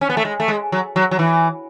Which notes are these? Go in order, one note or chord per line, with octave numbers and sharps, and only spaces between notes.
C#4
B3
A3
G#3
A3
G#3
F#3
F#3
F#3
E3